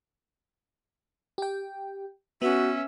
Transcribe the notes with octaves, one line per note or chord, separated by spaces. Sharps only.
G4 G5
B3 C#4 F#4 E5